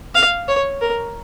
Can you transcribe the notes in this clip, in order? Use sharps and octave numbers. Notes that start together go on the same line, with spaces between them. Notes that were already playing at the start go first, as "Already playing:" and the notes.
F5
C#5
A#4